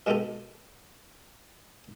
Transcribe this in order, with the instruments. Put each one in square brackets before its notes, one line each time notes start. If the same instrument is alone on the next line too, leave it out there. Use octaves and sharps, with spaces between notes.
[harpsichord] B2 G#3 A#3 D#4 G4 A4